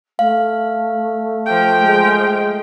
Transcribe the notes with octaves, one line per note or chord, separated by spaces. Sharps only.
A3 F5
F3 G5
G#3